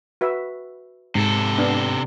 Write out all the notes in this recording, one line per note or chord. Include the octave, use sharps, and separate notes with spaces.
F#4 B4 E5
G#2 C3 A4
B3 D4